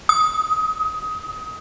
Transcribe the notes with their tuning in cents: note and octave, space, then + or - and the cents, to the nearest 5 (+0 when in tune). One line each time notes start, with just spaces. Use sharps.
D#6 +25